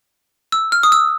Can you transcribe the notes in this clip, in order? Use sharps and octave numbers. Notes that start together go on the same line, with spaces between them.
E6
F6
D#6
E6